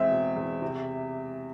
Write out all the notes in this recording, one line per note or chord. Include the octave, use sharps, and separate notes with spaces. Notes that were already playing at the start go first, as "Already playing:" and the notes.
Already playing: E2 G#3 C4 E5
B2
E2
C3